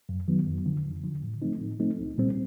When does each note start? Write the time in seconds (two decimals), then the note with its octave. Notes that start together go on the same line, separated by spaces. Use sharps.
0.09 F#2
0.28 D#3 F#3 B3
0.47 F2
0.66 D3 F3
0.85 F2
1.04 D3 F3
1.22 A2
1.42 F3 A3 C4 D#4
1.60 A2
1.79 F3 A3 C4 D#4
1.99 C2
2.18 A#2 G3 C4